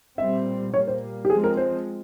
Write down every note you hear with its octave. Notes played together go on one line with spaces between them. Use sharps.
A#2 G3 C4 E5
A#2 G3 A#3 C#5
C5
G4
F3 G#3 C4 G#4
A#4
C5